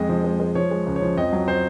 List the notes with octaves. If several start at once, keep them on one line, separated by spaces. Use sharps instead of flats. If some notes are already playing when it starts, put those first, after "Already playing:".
Already playing: F2 G#3 D#5
F3
G#3
G#3
F3 C#5
G#3
C#2
C#5
F3
F2 D#5
F#3
C5